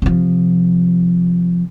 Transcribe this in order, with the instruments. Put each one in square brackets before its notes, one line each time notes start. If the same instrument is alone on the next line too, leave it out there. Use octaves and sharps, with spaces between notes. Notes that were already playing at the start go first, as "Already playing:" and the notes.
[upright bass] C3 F3